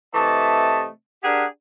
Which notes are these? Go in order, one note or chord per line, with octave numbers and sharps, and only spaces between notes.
C3 E3 A3 D#5 A5
D4 G4 G#4 A#4 F#5